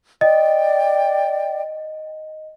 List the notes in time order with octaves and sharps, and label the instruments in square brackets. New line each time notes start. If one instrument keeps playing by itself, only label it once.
[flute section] D5 G5 [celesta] D#5